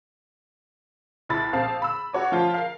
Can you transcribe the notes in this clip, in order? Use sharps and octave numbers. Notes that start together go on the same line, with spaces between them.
C2 E4 B5 A6
A#1 C4 F5 A5
B5 E6
F#4 C#5 D5
F3 F4 F5
A#4 F5